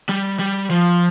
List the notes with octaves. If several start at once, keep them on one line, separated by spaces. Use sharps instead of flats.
G3
G3
F3